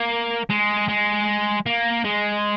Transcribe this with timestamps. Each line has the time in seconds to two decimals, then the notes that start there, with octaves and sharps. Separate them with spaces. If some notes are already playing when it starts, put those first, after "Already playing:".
Already playing: A#3
0.50 G#3
0.88 G#3
1.66 A#3
2.05 G#3